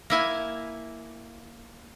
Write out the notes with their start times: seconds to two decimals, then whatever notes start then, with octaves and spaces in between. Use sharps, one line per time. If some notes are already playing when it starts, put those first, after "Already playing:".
0.10 A#3 E4 G#5